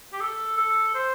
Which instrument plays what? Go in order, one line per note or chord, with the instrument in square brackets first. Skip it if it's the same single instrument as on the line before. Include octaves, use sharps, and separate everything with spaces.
[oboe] G4
A4
A4
C5